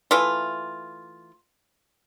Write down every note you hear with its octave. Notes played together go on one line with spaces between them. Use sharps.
E3 A3 F4